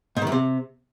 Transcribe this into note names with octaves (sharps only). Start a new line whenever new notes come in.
G#2
D#3
F#2
C3